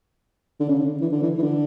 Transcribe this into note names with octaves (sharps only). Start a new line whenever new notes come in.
D3
C#3
D3
E3
D3
E3
E3
D3